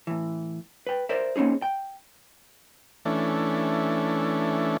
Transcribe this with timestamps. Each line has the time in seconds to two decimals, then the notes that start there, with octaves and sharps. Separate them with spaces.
0.07 A2 E3
0.87 B4 G5
1.09 A#4 C5 D5 E5
1.36 A#3 C4 C#4 D#4 G#4
1.62 G5
3.05 E3 A3 C#4 D4